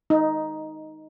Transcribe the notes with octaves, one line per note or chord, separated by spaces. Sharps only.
D#4